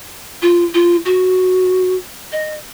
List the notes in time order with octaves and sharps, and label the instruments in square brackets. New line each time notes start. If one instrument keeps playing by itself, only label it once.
[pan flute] F4
F4
F#4
D#5